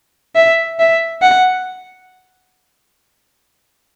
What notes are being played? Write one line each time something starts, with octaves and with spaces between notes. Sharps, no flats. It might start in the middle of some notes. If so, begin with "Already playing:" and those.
E5
E5
F#5